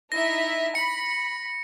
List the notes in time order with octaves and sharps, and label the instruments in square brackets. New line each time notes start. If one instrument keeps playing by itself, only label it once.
[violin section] D#4 E4 E5 [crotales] A#6
[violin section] B5 [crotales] C#7